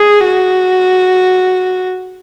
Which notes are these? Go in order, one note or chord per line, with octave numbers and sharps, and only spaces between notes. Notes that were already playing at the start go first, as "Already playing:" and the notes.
Already playing: G#4
F#4